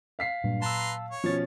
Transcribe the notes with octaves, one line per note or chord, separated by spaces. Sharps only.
F5 B6 C7
G2 A#2 F#3
B4 A5 A#5 C6 E6
C#5
B2 F3 C#4 A6